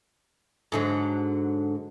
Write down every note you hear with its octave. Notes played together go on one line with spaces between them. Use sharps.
G#2 D3 F#3